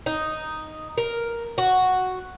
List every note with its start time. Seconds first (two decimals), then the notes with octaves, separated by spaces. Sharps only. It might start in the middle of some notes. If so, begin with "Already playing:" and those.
0.06 D#4
0.98 A#4
1.58 F#4